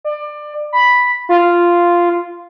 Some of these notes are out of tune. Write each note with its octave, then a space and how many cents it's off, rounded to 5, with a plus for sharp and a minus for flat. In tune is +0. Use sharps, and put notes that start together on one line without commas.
D5 +25
B5 +0
F4 -5